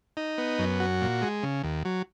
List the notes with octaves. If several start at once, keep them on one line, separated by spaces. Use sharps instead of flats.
D#4
B3
F#2
F#4
A#2
G#3
C#3
D#2
F#3